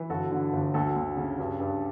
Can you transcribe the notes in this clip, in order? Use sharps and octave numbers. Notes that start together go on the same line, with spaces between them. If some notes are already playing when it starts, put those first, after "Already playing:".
Already playing: E3
G1 F#4 A4
D3
G1
D2 F#4 A4
D2
C#3
G2
G2